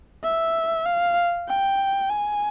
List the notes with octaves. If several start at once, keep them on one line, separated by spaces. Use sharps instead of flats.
E5
F5
G5
G#5